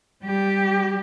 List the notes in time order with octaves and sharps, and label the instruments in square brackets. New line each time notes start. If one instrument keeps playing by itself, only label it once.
[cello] G3 G4